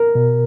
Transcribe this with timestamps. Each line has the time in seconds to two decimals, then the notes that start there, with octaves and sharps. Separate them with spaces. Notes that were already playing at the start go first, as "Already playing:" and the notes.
Already playing: A#4
0.15 B2